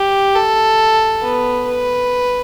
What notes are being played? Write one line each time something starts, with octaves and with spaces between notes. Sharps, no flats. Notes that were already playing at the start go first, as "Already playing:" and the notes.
Already playing: G4
A4
B3
B4